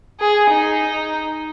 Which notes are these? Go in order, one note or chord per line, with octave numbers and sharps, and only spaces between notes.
G#4
D#4